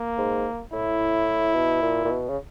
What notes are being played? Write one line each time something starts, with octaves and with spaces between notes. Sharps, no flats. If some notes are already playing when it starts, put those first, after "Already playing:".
Already playing: A#3
G#2
A2 E4
B2
A#2
A#2
B2
C#3